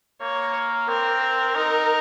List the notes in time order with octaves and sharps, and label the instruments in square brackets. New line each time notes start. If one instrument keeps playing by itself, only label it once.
[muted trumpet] A#3 [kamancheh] C#5
[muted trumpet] C4 [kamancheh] A#4
[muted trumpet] D#4